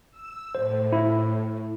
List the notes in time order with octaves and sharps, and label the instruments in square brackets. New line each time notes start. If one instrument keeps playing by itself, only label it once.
[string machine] E6
[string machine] A2 [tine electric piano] C5
[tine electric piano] E4